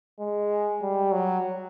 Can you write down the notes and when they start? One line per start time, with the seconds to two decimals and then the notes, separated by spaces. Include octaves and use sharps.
0.20 G#3
0.82 G3
1.12 F#3